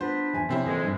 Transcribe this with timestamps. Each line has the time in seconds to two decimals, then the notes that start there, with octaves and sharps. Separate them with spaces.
0.01 B3 D4 F4 C5 B5
0.33 E2 G#5
0.49 F#2 C3 F3 C4 C#4 E4
0.66 F2 A#2 E3 G#3 A#3
0.84 G2